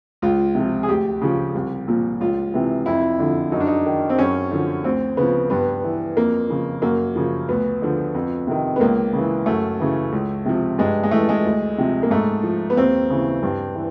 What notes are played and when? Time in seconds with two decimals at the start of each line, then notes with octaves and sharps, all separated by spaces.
0.22 C#2 F4
0.55 C3 F3
0.83 G#4
0.89 D2 G4
1.22 C#3 F3
1.55 C2
1.88 A#2 F3
2.20 C#2 F4
2.54 C3 E3
2.86 F2 E4
3.19 D3 F3
3.52 F#2 D#4
3.60 D4
3.67 D#4
3.86 D#3
4.10 C4
4.19 F#2 C#4
4.51 D3 F3
4.84 D2 C4
5.17 C#3 B3
5.22 F3
5.50 G2 B3
5.84 E3
6.17 F2 A#3
6.50 C#3 F3
6.82 F#2 A#3
7.15 C#3 F3
7.49 D2 B3
7.82 D3 F3
8.15 F2
8.47 C3 D#3
8.76 B3
8.80 C#2 A#3
9.13 C#3
9.18 E3
9.46 F#2 A3
9.80 C#3 E3
10.12 C#2
10.45 C3 F3
10.78 G2 G#3
11.03 G#3
11.11 E3 A3
11.29 G#3
11.45 D2
11.78 C3 F3
12.03 A#3
12.10 G#2 A3
12.43 F3
12.70 B3
12.77 D#2 C4
13.10 C#3 E3
13.43 G2
13.75 E3